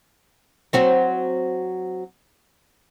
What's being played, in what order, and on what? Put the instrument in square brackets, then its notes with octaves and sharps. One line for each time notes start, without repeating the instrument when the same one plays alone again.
[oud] F#3 C4 F#4